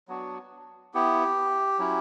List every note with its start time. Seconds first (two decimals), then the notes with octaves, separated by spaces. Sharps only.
0.08 F#3 B3 D4 F#4
0.94 B3 E4 G4
1.79 F#3 C#4 E4